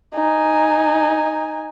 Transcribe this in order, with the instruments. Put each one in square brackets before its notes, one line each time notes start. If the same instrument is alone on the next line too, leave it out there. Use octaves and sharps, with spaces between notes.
[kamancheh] D#4 G#5